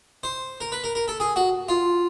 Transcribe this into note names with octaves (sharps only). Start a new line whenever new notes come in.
C5
A#4
B4
A#4
A#4
A4
G#4
F#4
F4